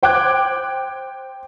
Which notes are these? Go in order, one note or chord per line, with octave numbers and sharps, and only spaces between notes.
C5 G5 D6 F#6 G#6